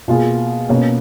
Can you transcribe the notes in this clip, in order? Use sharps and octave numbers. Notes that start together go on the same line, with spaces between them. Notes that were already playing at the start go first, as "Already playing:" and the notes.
B2 A#3 F4 G#4
B2 A#3 C#4